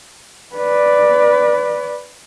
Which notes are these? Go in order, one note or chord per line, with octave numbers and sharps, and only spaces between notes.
B4 D5